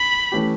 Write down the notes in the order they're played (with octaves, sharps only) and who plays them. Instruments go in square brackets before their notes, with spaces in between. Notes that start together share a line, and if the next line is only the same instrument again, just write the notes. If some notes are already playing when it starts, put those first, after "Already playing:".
Already playing: [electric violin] B5
[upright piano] E3 A3 C#4 G4